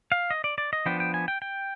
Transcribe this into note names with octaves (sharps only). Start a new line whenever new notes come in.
F5
D#5
D5
D5
D#5
F3 B3 D4 G5
G5
G#5
G5
G5